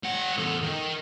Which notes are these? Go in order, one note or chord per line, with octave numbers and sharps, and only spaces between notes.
G3 F#5
E2 A4
D#3